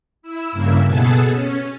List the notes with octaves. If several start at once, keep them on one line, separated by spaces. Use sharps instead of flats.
E4 E6
G2 C#3 A#3 E4 E5
B2 B3 G#4 A4 A5
C#4